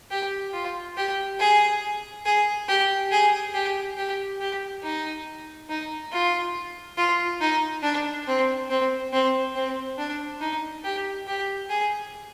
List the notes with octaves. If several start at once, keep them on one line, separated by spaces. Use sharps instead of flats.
G4
F4
G4
G#4
G#4
G4
G#4
G4
G4
G4
D#4
D#4
F4
F4
D#4
D4
C4
C4
C4
C4
D4
D#4
G4
G4
G#4